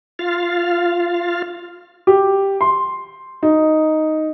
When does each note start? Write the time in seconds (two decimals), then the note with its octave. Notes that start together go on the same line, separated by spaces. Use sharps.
0.19 F4 F5
2.07 G4
2.61 C6
3.43 D#4